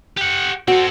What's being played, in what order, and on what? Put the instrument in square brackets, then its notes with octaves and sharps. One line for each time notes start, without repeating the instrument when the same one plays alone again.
[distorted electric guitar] G4 F#5
[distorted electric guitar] C4 A4 [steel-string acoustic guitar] F#4